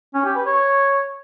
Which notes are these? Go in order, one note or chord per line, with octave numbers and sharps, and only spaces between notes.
C#4
G4
B4
C#5